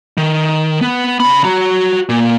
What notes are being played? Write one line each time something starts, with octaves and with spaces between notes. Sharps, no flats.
D#3
B3
C#3 B5
F#4 A#5
A#2